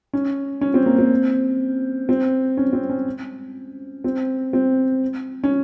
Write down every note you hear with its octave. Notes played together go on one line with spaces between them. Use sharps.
C#4
C#4
C4
A#3
C4
C4
C#4
C4
C#4
C4
C4
C#4